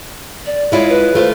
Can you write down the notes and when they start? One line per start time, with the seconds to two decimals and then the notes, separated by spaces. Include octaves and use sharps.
0.46 D5
0.72 G#3 E4 F4 C#5
0.89 B4
1.15 A3 F4 C5